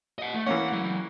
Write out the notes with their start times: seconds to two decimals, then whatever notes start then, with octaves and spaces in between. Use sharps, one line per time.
0.19 D#5 F#5
0.34 A3
0.46 E3 A#3 C#4 F#5
0.73 F#3 G#3